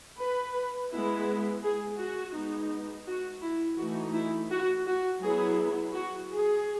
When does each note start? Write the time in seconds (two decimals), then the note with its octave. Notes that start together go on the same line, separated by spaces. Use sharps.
0.18 B4
0.91 G#3 B3 E4
1.63 G#4
1.99 F#4
2.34 G#3 B3 D#4
3.06 F#4
3.42 E4
3.78 E3 A3 D#4 F#4
4.14 E4
4.51 F#4
4.87 F#4
5.21 F#3 B3 E4 G#4
5.94 F#4
6.30 G#4